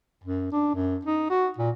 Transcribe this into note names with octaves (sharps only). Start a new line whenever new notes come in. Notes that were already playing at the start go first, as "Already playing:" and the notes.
F#2
D4
F#2
D#4
F#4
A#2